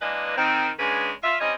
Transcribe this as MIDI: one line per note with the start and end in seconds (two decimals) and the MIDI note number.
0.01 0.36 52
0.01 0.36 56
0.01 0.36 58
0.01 0.36 62
0.01 0.36 71
0.01 0.36 75
0.38 0.69 51
0.38 0.69 60
0.79 1.11 49
0.79 1.11 56
0.79 1.11 58
0.79 1.11 61
0.79 1.11 62
0.79 1.11 71
1.23 1.36 65
1.23 1.36 76
1.40 1.54 55
1.40 1.54 60
1.40 1.54 61
1.40 1.54 73
1.40 1.54 75